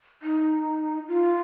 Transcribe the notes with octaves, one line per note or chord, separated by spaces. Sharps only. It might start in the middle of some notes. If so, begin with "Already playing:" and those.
D#4
F4